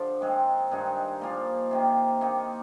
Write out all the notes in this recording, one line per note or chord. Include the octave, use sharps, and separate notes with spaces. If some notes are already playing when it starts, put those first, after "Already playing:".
Already playing: D3 F3 D4 F4 G4
D#3 G#3 C4 D#4
G2 D#3 G#3 D#4
A#2 F3 A#3 F4
C3 D#3 A#3
D#3 A#3 D#4